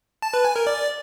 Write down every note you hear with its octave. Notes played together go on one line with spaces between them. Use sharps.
A5
B4
G#5
A#4
D5